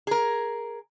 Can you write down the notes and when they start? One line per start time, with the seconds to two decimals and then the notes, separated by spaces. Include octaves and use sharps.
0.07 G#4 A#4